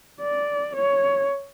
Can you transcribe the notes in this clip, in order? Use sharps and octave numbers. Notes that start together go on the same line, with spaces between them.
D5
C#5